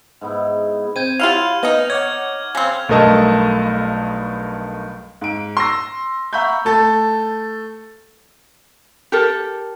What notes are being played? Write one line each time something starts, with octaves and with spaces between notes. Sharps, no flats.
G#2 B3 E4
C4 G6 G#6 D#7
F#3 E4 F4 G4 F5 F6 F7
C3 B3 D#4 D#5
C#5 F#5 D6 F6 G#6
C#3 C4
B1 G2 A3 A#4 D#5 A5
G#2 D7
C6 E6 A#6
E5 F#5 A#5 B5 C#6 G6
A3 A4 A6
G4 A4 A#4